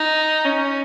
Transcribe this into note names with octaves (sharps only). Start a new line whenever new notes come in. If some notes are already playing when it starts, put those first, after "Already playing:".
Already playing: D#4
C#4